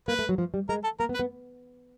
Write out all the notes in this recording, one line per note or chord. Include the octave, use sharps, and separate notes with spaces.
A#3 B4
A3
F#3
F3
G3
G#3 A#4
A4
A#3 A#4
B3
B4
B3